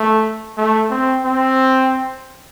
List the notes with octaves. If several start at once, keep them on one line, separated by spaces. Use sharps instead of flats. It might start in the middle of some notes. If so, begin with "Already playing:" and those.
Already playing: A3
A3
C4
C4